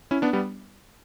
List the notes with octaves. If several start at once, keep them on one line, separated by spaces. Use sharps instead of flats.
C#4 E4
B3 D4
G3 B3